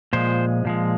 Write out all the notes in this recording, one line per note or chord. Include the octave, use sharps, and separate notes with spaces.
A#2 F3 G#3 C5
A#2 F3 G#3